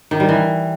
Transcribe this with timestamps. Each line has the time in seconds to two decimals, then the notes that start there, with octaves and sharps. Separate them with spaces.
0.11 D#3
0.20 G3
0.29 E3